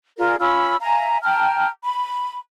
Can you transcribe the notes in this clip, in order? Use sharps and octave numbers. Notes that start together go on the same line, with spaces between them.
F4 G#4 A#4 D5
C#4 F4 B5 E6
E5 F5 G#5 A#5
G5 A5 A#5 F6
B5